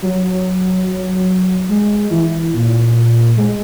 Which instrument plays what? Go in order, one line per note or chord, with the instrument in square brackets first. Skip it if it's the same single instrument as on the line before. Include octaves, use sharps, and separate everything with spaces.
[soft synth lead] F#3
G#3
E3
A#2
G#3